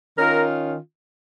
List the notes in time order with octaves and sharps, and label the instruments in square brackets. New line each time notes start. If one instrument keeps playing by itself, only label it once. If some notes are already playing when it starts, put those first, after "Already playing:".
[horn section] D#3 C#4 F4 A#4